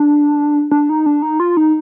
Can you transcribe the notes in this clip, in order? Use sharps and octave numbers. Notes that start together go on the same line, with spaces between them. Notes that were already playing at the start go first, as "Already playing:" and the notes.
Already playing: D4
D4
D#4
D4
D#4
F4
D#4